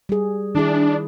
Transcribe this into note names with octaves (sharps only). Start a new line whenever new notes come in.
G3 G#4
D#3 D4 E4 G#4